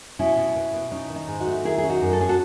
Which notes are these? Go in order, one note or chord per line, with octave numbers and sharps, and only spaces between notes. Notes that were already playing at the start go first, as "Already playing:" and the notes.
B2 C#4 E4
B2
B2
B2
C#4 D#4
D#3
D#4
G#2
D#4 F#4
A3
D#3 E4 G#4
G#4
C#4
D#4 F#4
F#2
A4
C#4 G#4
F#4 A4